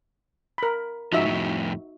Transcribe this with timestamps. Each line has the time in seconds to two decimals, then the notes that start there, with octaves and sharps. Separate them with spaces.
0.58 A#4 B5
1.13 G#2 F3 D#4 F#4 E5
1.26 F2 A2